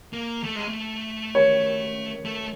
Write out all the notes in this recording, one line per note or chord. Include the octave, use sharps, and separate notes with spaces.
A#3
A3
G#3
A3
C#5
A3